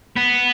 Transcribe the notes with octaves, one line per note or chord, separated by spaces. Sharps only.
B3